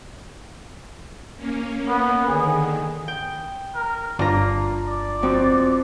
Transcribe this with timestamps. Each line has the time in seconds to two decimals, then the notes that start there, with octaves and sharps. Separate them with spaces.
1.36 A#3 C#4
1.88 B3
2.27 D3 D#3 G#4
3.08 G5
3.75 A#4
4.19 G1 A#3 D4 F4 A#5
4.88 D5
5.22 F2 C4 F#4